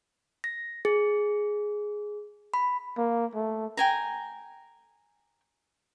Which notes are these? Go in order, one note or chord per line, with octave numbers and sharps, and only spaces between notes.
A#6
G#4
B5
A#3
A3
G5 G#5 A#5